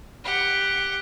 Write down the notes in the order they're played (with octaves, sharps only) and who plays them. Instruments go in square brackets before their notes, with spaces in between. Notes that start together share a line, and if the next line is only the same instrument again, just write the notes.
[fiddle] G4 F#5